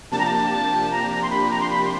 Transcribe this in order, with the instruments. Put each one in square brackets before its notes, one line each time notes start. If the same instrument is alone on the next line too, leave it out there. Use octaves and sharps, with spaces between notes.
[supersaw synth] C3 F3 A#3 D4 G4 [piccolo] A5
[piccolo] A#5
A5
A5
A#5
A#5
C6
B5
A#5
C6
B5
C6